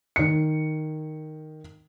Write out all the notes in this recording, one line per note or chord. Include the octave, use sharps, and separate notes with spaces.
D#3 C#7